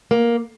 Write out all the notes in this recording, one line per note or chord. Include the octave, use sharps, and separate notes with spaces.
A#3